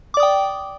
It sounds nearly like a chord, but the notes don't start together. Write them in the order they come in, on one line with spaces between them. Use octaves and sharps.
D6 D5 D#6 G5